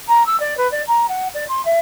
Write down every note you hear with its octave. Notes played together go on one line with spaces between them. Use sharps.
A#5
E6
D5
B4
D5
A#5
F#5
D5
C6
E5